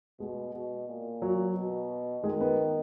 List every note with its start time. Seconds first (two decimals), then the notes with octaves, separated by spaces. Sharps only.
0.20 B2 G#3
0.54 B2
0.88 A#2
1.22 F#3
1.56 B2
2.24 D#3 G#3
2.41 B3